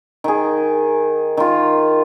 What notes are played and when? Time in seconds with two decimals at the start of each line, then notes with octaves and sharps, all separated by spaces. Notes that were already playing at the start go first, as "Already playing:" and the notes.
0.24 D#3 G#4
1.37 D#3 F4